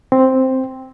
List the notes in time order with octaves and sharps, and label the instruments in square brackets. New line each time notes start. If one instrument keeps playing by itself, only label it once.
[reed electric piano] C4